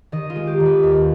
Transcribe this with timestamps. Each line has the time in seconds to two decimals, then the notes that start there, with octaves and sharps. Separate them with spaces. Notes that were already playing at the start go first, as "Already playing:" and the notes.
0.12 D#3 D#5
0.30 F4
0.36 G#3
0.47 G4
0.60 D#3
0.65 B4
0.83 D#2